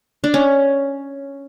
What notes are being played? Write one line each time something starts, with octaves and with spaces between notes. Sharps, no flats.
D4
C#4